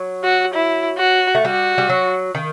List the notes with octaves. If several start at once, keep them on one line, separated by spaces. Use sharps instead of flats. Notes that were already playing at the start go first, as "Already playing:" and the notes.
Already playing: F#3
F#4
E4
F#4
A3
G3 F#4
G3
F#3
D#3